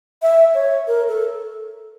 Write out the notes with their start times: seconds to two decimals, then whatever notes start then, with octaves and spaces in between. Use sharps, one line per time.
0.22 E5
0.55 C#5
0.87 A#4
1.09 A4